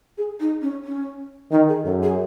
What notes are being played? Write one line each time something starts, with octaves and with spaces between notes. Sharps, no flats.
G#4
D#4
C#4
C#4
D#3 D#4
G#4
F#2 A4
G#4